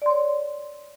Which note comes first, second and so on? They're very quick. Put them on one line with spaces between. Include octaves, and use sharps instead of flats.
D5 C6 C#5